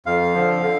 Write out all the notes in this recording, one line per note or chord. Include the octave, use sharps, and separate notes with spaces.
F2 F5
D3 F3
D3